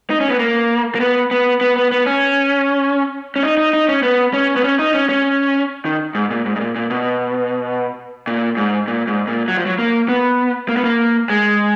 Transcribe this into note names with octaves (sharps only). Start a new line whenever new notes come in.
D#4
C#4
B3
A#3
A#3
B3
B3
B3
B3
B3
C#4
C#4
D#4
D#4
D#4
C#4
B3
C#4
B3
C#4
D#4
C#4
C#4
D#3
G#2
A#2
G#2
G#2
A#2
A#2
B2
A#2
G#2
A#2
G#2
A#2
F#3
F3
F#3
A#3
B3
A#3
B3
A#3
G#3